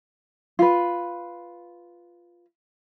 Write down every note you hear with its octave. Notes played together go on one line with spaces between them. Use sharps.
F4 B4